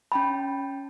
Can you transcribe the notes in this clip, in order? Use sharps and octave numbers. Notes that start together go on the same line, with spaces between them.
C#4 G5 A5 B5